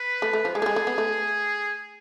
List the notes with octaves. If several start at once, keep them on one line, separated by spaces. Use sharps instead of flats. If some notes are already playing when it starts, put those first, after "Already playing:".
Already playing: B4
A3
A3
F3
G#3 G#4
A3
G#3
A3
B3
A3